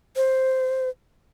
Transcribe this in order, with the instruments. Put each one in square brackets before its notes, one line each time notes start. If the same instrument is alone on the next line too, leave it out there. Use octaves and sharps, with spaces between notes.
[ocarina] C5